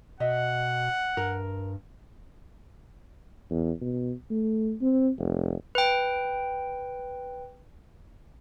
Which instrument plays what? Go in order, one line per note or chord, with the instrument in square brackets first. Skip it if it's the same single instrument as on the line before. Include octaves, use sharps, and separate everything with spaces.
[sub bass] B2 [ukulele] D#5 E5 [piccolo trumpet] F#5
[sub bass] G2 [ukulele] A#4
[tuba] E2
B2
A3
C4
F1
[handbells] B4 G5